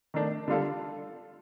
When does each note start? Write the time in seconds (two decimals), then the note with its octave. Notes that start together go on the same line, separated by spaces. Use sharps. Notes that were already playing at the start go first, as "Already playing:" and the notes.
0.14 D#3 A3 D4
0.48 D3 G3 D4 F4 A4